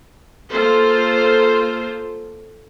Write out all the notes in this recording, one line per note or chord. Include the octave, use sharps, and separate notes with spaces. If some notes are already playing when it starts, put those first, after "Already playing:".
A#3 F4 A4 C5